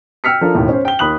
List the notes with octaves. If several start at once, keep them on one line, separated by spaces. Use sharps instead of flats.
G5 E6 F6 B6 C#7
F3 D4 A4 A#4
E1 D#2 A2
C#4 C5
G5 G7
D#2 B5 D#6 F#6 F#7